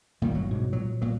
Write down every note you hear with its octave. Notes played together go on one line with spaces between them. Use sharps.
D#1 A#2 D#3 G3 A3
G1 F#3
G#2 B2 G#3
A#2 F#3
A#2 F#3